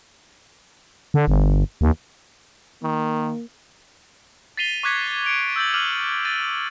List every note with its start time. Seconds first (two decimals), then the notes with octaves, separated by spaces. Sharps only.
1.14 D3
1.27 G1
1.81 D#2
2.83 D#3 A#3
4.57 A6 B6 C7 D#7 F7 G7
4.83 C#6 D6 F#6 G#6 B6 C#7
5.24 C#7 D7 F7
5.56 E6 G6 A6 F#7
5.74 D6 F6 D#7 F7 F#7
6.25 A6 D#7